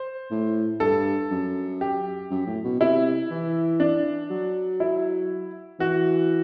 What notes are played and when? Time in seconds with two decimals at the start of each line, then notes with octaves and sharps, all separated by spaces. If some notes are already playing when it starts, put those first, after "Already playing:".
Already playing: C5
0.31 A2
0.80 G2 A4
1.31 F#2
1.81 G4
2.31 F#2
2.47 A2
2.64 B2
2.80 C3 E4
3.30 E3
3.80 D4
4.30 F#3
4.80 E4
5.79 E3 F#4